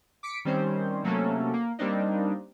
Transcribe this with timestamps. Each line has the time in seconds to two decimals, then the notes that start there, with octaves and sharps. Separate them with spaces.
0.23 D6 B6 C#7 D7
0.45 D#3 G3 C4 C#4 C5
1.04 C3 F#3 A3 A#3 C#4 A4
1.54 A#3
1.79 G3 A#3 C4 D4 D#4